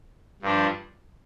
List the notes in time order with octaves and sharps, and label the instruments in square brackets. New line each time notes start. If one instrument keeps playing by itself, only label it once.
[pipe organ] G2 F3 D4